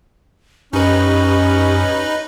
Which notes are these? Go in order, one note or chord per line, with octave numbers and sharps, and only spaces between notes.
F#2 C#4 D#4 G4 B4 D#6